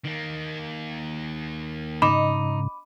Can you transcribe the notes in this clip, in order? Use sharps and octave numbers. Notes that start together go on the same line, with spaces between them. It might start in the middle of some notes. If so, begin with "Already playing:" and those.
D#3 A#3
G#2 C#3 D#4 B5 D6